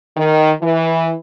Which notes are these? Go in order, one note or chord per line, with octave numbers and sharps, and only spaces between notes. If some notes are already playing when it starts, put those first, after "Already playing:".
D#3
E3